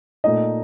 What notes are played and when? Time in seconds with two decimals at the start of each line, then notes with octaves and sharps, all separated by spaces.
0.24 A#2 A3 D#4 D#5